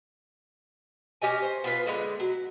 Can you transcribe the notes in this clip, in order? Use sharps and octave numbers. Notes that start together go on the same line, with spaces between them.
C#4 G4 D#5 G#5
C5
B3 F4 B4
D3 G#3 B3
F#3